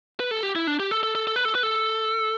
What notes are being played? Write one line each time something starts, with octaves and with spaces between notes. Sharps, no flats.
B4
A4
G4
E4
D4
G4
A4
A4
A4
A4
B4
A4
B4
A4